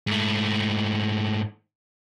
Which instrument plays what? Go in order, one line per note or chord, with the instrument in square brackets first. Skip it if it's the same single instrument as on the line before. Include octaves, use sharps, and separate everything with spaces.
[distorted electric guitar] G#2 A3